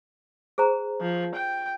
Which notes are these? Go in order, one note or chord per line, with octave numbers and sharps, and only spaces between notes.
G#4 C5 A#5
F3
G5